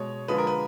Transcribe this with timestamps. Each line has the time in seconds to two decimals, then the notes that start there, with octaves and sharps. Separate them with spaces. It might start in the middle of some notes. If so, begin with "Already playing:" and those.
Already playing: B2 G#3 C#5
0.28 D3 F3 G#3 B4
0.38 A#4
0.47 B4